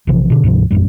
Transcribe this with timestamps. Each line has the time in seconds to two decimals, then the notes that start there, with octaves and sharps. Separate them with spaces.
0.07 A#1 C3 E3 F3
0.30 B2 D3
0.43 D2 G#2 C3 F3
0.71 E1 A#1 F#2 G3